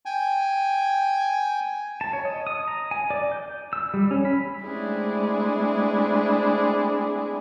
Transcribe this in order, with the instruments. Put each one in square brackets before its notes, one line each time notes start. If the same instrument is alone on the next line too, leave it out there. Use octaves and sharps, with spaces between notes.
[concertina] G5 G#5
[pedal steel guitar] A5
C#5
D#5
D#6
A#5
G#5
D5
G6
E6
G3
C#4
B5
[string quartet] G#3 A3 C4 D4 E4 G#4